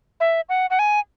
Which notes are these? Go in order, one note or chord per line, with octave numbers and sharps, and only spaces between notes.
E5
F#5
F#5
G#5